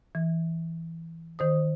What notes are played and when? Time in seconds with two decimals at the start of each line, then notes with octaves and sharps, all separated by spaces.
0.15 E3
1.39 D#3 C5 D#6